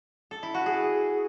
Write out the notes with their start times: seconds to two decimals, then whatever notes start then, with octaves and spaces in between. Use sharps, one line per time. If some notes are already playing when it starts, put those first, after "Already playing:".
0.31 A4
0.43 E4
0.54 F#4
0.66 G#4